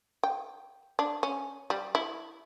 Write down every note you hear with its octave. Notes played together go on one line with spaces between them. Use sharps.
G5
D4
C#4
G3
E4